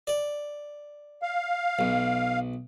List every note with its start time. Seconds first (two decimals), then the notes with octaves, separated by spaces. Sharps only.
0.07 D5
1.22 F5
1.79 B1